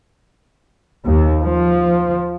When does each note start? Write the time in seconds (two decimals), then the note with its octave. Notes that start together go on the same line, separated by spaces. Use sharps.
1.06 D#2
1.43 F3